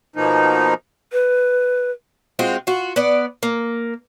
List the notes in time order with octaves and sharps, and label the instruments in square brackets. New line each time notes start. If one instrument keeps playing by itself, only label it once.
[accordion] B2 F3 A#3 D#4
[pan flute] B4
[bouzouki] G#3 C4 F4 F#4
F4 F#4
B3 D5
A#3